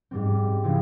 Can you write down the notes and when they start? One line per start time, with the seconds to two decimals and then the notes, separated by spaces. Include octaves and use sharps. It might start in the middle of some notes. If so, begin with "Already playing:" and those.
0.11 G#2 G3 C4
0.64 C#3 F3 C4 E4